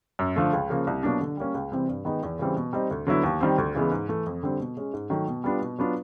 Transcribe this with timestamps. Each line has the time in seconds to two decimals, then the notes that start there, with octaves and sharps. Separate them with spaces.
0.19 F#2
0.36 D3 F3 A3
0.53 C#2
0.70 C#3 F3 A#3
0.87 C2
1.03 B2 F#3 A#3 D4
1.21 D3
1.37 G3 A#3 C#4
1.54 C#2
1.72 C3 E3 G3 C4
1.89 G2
2.05 D#3 G#3 B3 D#4
2.23 E2
2.39 C#3 E3 G3 C4
2.56 B2
2.73 G3 C4 D#4
2.91 D2
3.07 D3 F#3 B3 E4
3.24 D#2
3.40 D#3 G3 C4
3.58 D2
3.75 C#3 E3 G#3 B3
3.91 G#2
4.08 E3 A3
4.26 F2
4.43 D3 G3 C4
4.60 B2
4.77 G#3 C#4
4.93 G#2
5.10 D#3 F#3 A3
5.28 B2
5.44 G3 B3 D4 F4
5.61 B2
5.79 F#3 B3 D4 F4